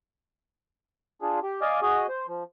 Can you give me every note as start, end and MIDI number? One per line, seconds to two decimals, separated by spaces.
1.22 1.39 62
1.22 1.39 65
1.22 1.39 68
1.43 1.60 67
1.62 1.80 74
1.62 1.80 75
1.62 1.80 77
1.62 1.80 80
1.62 1.80 86
1.82 2.07 66
1.82 2.07 68
1.82 2.07 75
2.09 2.26 72
2.27 2.43 53